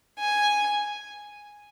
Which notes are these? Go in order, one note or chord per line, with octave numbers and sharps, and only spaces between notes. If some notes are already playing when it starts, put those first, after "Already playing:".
G#5